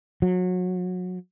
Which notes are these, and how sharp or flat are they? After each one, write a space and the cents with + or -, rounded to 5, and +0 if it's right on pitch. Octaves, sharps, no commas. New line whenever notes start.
F#3 -25